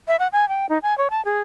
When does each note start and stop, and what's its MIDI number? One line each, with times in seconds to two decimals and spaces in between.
0.08 0.16 76
0.19 0.28 78
0.33 0.48 80
0.49 0.66 79
0.69 0.78 63
0.83 0.97 80
0.98 1.08 73
1.10 1.24 81
1.25 1.42 68